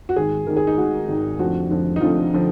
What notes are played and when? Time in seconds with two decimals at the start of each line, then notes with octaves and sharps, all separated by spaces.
0.09 F#4
0.16 G#1 G#2 D#3 G#4
0.47 G#1 G#2 D#3 A#4
0.57 G#4
0.67 D#4
0.77 G#1 G#2 D#3 F#4
1.09 G#1 G#2 D#3
1.39 F1 F2 D3 F3 F#4
1.70 F1 F2 D3 F3
1.96 D#4
2.01 F1 F2 D3 F3 F4
2.33 D3 F3